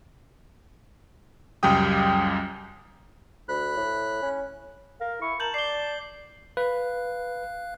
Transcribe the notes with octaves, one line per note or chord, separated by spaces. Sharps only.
C#2 F#2 G3 G4 G5 D#6
D2 B5 F#6
A2
C#4
A#4 F5
E4 C#6
A#4 A5 G6 F#7
D5 C7 G7
B4 F5 F#6